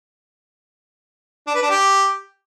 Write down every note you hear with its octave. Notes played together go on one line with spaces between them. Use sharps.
D4
B4
D4
G4